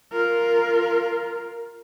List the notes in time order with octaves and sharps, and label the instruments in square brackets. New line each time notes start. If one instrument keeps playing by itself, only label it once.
[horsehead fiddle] F4 A#4